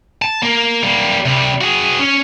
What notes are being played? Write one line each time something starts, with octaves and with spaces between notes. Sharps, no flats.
A5
A#3
G3 A#3
C3 G3
F#4 G#4
C#4